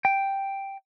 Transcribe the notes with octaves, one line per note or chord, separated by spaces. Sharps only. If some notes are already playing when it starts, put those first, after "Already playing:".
G5